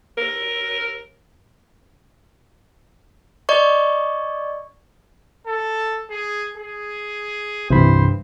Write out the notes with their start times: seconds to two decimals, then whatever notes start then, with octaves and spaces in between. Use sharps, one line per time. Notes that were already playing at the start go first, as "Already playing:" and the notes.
0.17 A#4
3.49 D5 D#5 C#6
5.46 A4
6.10 G#4
6.58 G#4
7.70 C2 G2 C3 E3 C5 B5